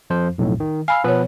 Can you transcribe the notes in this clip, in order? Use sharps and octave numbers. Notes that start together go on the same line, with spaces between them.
F2 F3 C5
B1 F2 A2
D#3
F5 G#5 B5 E6
B2 F3 B3 B4 C#5